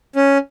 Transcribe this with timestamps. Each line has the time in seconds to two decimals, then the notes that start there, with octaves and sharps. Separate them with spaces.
0.16 C#4